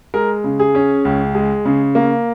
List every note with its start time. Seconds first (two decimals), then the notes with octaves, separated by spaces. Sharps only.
0.14 G#3 A#4
0.44 C#3
0.59 G#4
0.75 C#4
1.05 C#2
1.35 G#3
1.65 C#3
1.95 A#3